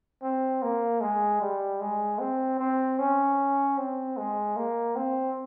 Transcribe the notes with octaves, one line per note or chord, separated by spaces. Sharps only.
C4
A#3
G#3
G3
G#3
C4
C4
C#4
C4
G#3
A#3
C4